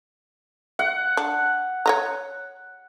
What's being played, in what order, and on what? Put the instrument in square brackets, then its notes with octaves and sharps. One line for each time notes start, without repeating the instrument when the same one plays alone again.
[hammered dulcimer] F#5
[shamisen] D4
C#5 D#5 A#5